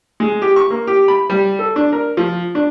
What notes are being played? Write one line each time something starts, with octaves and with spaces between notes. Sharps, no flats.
G#3
G4
C#6
A#3
G4
B5
G3
A4
D4
A#4
F3
D4